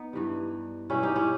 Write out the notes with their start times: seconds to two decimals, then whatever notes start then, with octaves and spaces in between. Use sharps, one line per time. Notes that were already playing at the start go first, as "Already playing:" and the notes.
Already playing: B3 D#4
0.13 G2 E3 G3
0.90 B2 G3 C#4 E4
1.03 D#4 G4
1.16 C#4 E4